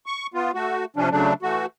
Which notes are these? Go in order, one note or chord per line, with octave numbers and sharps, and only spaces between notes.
C#6
B3 F4
A3 F#4
C3 F3 C#4 D4
C#3 F#3 A3 D4
E3 A3 F#4